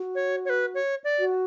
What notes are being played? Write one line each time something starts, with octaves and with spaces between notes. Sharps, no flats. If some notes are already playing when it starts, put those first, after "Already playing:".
Already playing: F#4
C#5
C#5
B4
C#5
D5
F#4